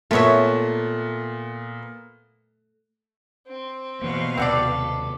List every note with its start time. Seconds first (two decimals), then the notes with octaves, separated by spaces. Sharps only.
0.11 A#2 A3 B3 C#5 E5
3.46 C4
4.02 B2 E3 A#3 F5
4.37 D#2 C3 C4 F#4 A4 B4 D5